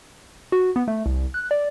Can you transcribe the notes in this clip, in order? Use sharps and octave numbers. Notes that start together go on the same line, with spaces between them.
F#4
B3
A3
C2
F#6
D5